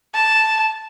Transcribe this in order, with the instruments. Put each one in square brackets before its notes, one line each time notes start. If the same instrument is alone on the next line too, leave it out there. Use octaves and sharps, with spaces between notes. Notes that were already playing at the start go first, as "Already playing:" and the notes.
[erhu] A5